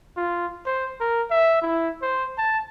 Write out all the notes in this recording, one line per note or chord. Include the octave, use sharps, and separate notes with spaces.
F4
C5
A#4
E5
E4
C5
A5